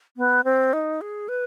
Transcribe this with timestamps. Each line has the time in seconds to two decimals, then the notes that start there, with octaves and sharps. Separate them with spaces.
0.17 B3
0.44 C4
0.73 D#4
1.01 G#4
1.29 B4